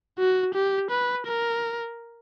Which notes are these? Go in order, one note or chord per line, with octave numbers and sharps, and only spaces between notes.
F#4
G4
B4
A#4